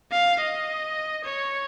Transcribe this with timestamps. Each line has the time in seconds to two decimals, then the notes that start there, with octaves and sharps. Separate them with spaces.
0.12 F5
0.40 D#5
1.24 C#5